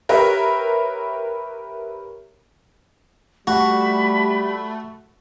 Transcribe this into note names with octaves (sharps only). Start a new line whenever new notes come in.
G4 A#4 B4 C#5 E5
G3 A3 F#4 B5